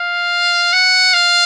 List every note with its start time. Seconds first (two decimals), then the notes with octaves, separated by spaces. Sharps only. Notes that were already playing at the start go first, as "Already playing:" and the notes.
Already playing: F5
0.73 F#5
1.14 F5